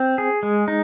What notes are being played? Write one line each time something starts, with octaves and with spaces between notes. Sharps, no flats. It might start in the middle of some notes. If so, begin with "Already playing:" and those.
Already playing: C4
G#4
G#3
D#4